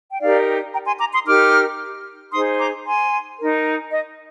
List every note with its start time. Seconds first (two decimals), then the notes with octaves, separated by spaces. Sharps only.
0.11 G5
0.21 D#4 G4 A#4 D5 F5
0.74 G5 A#5
0.86 G#5 C6
1.00 A#5 D6
1.13 C6 D#6
1.26 D#4 G4 A#4 D6 F6
2.32 D#4 G#4 C5 C6 D#6
2.58 A#5 D6
2.85 G#5 C6
3.38 D#4 A#4
3.91 D#5